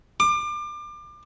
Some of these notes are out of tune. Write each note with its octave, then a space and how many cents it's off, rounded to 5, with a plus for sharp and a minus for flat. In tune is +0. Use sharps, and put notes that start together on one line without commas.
D6 +30